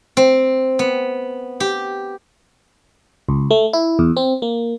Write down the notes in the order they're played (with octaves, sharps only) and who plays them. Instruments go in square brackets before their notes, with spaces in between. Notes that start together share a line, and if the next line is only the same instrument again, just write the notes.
[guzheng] C4
B3
G4
[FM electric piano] C#2
A3
E4
E2
C4
A#3